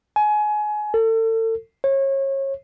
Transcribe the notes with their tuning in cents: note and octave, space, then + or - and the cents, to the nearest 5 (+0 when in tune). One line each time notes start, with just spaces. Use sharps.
G#5 +25
A4 +35
C#5 -30